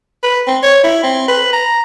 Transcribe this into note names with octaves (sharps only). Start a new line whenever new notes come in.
B4
C4
C#5
E4
C4
B4
A#5